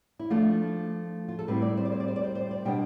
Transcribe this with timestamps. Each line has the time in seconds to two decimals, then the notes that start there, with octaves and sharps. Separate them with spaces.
0.19 E4
0.30 F3 A3 D4 F4
1.28 F4
1.39 A4
1.48 A2 G3 C4 E4 B4
1.62 D5
1.77 C5
1.85 D5
1.92 C5
2.00 D5
2.08 C5
2.16 D5
2.24 C5
2.35 C5
2.51 D5
2.65 B2 G3 B3 D4 G5